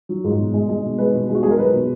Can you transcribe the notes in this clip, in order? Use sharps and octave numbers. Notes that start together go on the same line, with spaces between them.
F#3
G#2
B2
G#3
G#3
B2
G#3 B4
B2
G#3
F#4
G#3 G#4
A#4
F#3 B4
B2